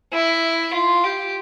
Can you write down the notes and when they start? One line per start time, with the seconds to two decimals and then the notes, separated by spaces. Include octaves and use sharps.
0.13 E4
0.73 F4
1.04 G4